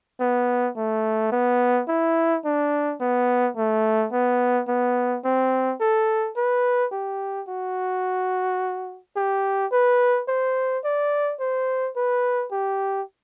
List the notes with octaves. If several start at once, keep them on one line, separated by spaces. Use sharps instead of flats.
B3
A3
B3
E4
D4
B3
A3
B3
B3
C4
A4
B4
G4
F#4
G4
B4
C5
D5
C5
B4
G4